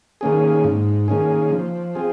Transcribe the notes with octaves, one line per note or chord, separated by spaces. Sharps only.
D#3 A#3 C#4 G#4
G#2
D#3 A#3 C#4 G#4
F3
C4 F4 G#4